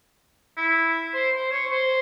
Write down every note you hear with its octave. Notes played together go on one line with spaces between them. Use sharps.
E4
C5
C5
C#5
C5